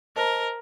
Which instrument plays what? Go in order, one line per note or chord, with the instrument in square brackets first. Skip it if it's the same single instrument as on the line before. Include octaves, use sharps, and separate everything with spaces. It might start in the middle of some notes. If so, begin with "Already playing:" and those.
[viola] A#4 [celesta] C5 D#5 A5